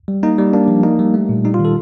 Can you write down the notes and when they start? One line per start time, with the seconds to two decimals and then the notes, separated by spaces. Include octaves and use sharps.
0.08 G3
0.23 A#3 D#4
0.38 G3
0.53 A#3 D4
0.68 F3
0.83 A#3 D#4
0.99 G3
1.14 A3
1.29 A#2
1.44 G3 D#4
1.54 F4
1.59 D#3
1.65 A4